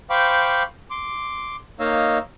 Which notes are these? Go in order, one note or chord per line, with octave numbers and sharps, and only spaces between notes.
C5 F5 G5 B5 C#6 D6
C6 D6
A#3 D#4 C#5 D#5 F5 E6